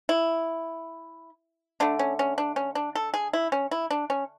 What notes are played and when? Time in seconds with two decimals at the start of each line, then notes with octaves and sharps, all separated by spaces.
0.09 E4
1.80 D3 A3 D4
1.99 C#4
2.19 C#4
2.38 D4
2.56 C#4
2.75 D4
2.95 A4
3.14 G#4
3.33 E4
3.52 C#4
3.71 E4
3.91 D4
4.10 C#4